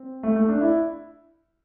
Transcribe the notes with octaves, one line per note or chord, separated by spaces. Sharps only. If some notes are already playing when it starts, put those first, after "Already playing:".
Already playing: C4
A3
A3
D4
E4